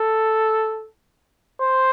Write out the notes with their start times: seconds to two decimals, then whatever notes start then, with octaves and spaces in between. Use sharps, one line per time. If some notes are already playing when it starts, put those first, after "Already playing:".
Already playing: A4
1.61 C5